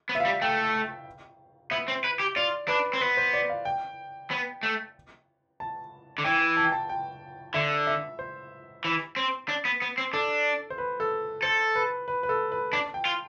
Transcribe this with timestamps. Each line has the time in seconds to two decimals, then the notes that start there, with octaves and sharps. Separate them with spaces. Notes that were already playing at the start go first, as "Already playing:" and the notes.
0.09 B3
0.15 E5
0.20 F5
0.25 G3
0.42 A3 G5
1.71 B3 E5
1.88 C4
2.04 B4
2.20 G4
2.36 F4 D5
2.68 D4 B4
2.93 C4
3.01 B3 B4
3.17 C5
3.33 D5
3.49 F5
3.65 G5
4.31 B3
4.63 A3
5.60 A5
6.18 D3
6.24 E3 G5
6.57 A5
6.65 G5
6.72 A5
6.89 G5
7.54 D3 E5
7.87 E5
8.19 C5
8.85 E3
9.16 C4
9.49 D4
9.65 B3
9.82 B3
9.98 C4
10.13 D4 A4
10.70 C5
10.78 B4
11.00 A4
11.43 A4 C5
11.75 B4
12.08 B4
12.23 B4
12.29 A4
12.52 B4
12.73 D4 A5
12.94 G5
13.05 F4